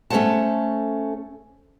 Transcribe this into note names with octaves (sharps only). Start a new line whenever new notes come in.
A3 C#4 A4 C5 F#5 A5